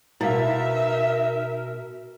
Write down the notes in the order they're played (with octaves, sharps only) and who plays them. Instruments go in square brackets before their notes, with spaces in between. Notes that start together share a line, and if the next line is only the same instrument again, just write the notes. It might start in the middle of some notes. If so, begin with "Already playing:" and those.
[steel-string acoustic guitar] B2 [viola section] D#4 E5 [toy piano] E4 F5 [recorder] A#4